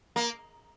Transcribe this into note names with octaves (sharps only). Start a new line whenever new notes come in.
A#3